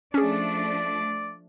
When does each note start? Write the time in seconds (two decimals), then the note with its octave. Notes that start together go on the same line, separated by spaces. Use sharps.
0.14 F3 A3 C#4 D4 G#4 D5